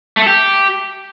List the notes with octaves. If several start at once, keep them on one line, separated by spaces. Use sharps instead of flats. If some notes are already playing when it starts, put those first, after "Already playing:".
A3
A4
G4